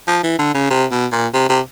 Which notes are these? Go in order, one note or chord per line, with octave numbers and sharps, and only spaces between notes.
F3
E3
D3
C#3
C3
B2
A#2
C3
C3